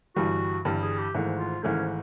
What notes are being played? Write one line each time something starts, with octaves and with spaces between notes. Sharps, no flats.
G1 G2 E3 G3 F#4
G1 G2 E3 G3
G#4
G4
G#1 G#2 E3 A3
F4
G#1 G#2 E3 A3 C#4